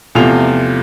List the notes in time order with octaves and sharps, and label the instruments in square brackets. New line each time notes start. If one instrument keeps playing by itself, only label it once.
[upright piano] E2 C3 F3 A3 F4 F7